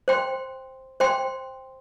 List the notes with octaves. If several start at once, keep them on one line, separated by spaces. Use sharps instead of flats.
C5 G5 C6
C5 G5 C6